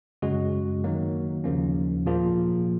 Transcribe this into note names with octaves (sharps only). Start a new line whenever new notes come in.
F#2 C#3 G#3 C#4 F#4
D#3 F#3 A#3
D#2 C#3 F3 A#3 C#4
A#2 F3 A#3 F4 G#4